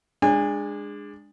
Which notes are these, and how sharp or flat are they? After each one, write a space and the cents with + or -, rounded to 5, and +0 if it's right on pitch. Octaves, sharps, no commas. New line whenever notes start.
G#3 -15 D4 +10 G#5 -30